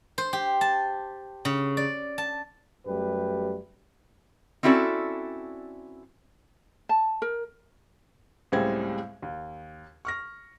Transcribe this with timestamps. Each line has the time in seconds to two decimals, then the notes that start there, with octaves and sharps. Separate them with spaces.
0.18 C5
0.33 G4
0.61 A5
1.45 C#3
1.77 D5
2.18 A5
2.86 F#2 G3 A3 G4 B4
4.63 C4 C#4 E4 F#4 A4 D5
6.89 A5
7.22 A#4
8.52 C#2 A2 G3 G#3 C4 G#6
9.22 D#2
10.05 C#6 F6 A#6